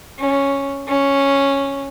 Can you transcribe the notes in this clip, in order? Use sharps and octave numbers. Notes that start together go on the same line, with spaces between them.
C#4
C#4